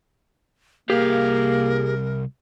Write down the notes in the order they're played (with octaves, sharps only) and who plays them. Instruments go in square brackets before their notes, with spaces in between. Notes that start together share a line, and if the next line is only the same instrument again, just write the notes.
[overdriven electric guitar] C2 F5 [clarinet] A#3 [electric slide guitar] G4 G#4 [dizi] A#4